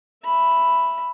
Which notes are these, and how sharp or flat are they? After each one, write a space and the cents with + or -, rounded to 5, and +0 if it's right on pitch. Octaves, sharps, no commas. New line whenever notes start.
E5 +0 B5 +0